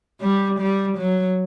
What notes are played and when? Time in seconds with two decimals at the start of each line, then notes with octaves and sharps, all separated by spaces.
0.21 G3
0.59 G3
0.98 F#3